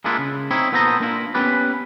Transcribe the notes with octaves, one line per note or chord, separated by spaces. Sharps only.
G#3 A#3 B3 D4 E4 F4
C#3
C4 D#4 E4 C#5
A#2 B3 A4 C5 D#5 A#5
A#3 D4 E4 F4
B3 C#4 G4 B4 D5